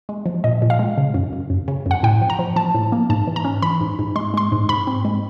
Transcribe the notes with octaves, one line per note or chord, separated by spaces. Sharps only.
G#3
F3
A#2 D#5
A#2
F5
G#3
C#3
F#2
F#2
F#2
C#3
F#2
F#5
A2 G5
F3
A#5
F3
F3 A5
A2
A#3
G#2 A5
E3
A#5
C#4
E3 B5
G#2
G#2
G#3 C6
G#3 C6
G#2
G#2 B5
C4
G#3